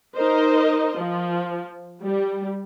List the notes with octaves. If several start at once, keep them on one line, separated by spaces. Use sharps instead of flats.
D#4 A#4 C5 D#5
F3
G3